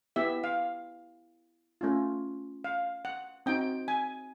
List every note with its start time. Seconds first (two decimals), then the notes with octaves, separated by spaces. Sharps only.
0.16 B3 E4 G4 E5
0.44 F5
1.81 A3 C#4 F4
2.64 F5
3.05 F#5
3.46 C4 D#4 F#4 G5
3.88 G#5